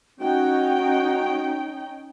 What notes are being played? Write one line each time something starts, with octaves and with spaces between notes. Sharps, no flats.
C#4 D#4 F#4 G5